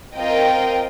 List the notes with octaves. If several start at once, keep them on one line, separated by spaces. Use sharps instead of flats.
C4 F4 A#4 D#5 G5